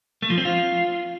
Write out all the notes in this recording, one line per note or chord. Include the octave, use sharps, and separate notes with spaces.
A3
F3
C4
F4